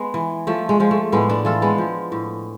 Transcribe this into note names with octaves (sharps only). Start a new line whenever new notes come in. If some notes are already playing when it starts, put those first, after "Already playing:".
Already playing: G#3 B3
E3
F3 A3
G#3
F3 G#3
A3
A2 G#3 B3
B3 D4
E3 F4 A4
G#3 B3
F3
A2